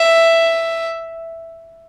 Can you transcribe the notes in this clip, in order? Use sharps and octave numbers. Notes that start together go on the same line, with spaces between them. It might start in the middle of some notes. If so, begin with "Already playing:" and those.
Already playing: E5